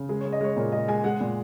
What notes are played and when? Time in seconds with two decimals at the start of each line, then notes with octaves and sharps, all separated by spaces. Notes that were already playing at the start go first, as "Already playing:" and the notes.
Already playing: C#3
0.09 G#3 G#4
0.21 G#3 C#5
0.33 D#5
0.41 G#3 C#5
0.56 A#2 A#4
0.72 G#3 D#5
0.88 G#3 G#5
1.04 G#3 F#5
1.21 A#2